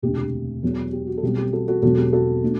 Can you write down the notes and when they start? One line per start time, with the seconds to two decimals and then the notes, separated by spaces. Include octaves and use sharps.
0.02 E1 D2 C3 G4
0.18 G4
0.63 E2 B2 F#3
0.93 G4
1.07 F#4
1.18 A4
1.22 B1 B2 G3 C4 G4
1.38 G4
1.53 F#4 A4
1.68 F#4 A4
1.82 E1 E2 B2 F#3 C4 F#4 A4
1.98 G4
2.13 F#4 A4
2.44 B2 A3 D4